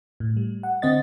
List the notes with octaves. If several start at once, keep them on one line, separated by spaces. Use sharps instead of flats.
A2
G3
F#5
D3 C4 C5 D#5 A6